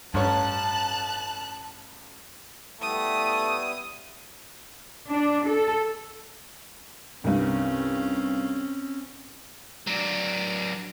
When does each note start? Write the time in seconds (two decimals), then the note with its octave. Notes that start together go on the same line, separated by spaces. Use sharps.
0.14 A1 G2 C#4 C#5 A5 F#6
2.81 G3 A3 B3 E4 D#6
5.10 D4
5.48 A4
7.24 C2 G2 C4 C#4
9.87 F#3 D4